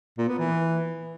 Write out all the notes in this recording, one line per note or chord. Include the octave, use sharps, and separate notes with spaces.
A#2
B3
E3